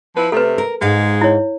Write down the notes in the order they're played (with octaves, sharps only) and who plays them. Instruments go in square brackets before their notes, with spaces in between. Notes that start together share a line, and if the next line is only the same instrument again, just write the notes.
[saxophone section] F3 E4 B4
[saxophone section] C3 A3 [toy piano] A4 B4
[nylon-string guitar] A#4
[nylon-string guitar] G#2 F5 [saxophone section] G#3 D#4
[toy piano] E4 C#5